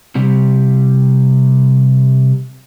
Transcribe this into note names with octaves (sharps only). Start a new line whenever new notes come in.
C3 G3